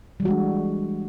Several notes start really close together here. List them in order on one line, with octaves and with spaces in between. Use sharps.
G3 E3 F#4 G#3 D4